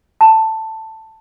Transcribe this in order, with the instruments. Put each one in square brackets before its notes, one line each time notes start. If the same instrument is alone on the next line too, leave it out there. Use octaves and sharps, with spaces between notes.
[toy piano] A5